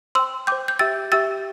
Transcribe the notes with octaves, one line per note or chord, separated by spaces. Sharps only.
C5 G5 C6 E6
C5 G5 D6 G6
G6
G4 E5 G5 E6 A6
G4 E5 G5 E6 A6